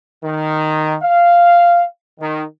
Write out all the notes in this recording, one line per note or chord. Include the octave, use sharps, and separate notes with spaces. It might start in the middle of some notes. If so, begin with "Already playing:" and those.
D#3
F5
D#3